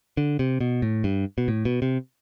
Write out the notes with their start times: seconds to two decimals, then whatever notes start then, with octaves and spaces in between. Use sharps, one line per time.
0.17 D3
0.39 C3
0.61 B2
0.82 A2
1.04 G2
1.38 B2
1.48 A2
1.65 B2
1.82 C3